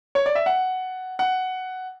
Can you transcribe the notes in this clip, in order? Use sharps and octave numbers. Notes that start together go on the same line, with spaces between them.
C#5
D5
E5
F#5
F#5